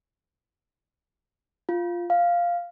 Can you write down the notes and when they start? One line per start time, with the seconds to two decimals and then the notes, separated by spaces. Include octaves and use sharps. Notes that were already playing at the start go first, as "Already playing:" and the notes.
1.69 F4
2.10 F5